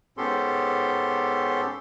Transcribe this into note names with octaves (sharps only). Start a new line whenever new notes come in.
G#2 B3 C#4 G4 A4 C6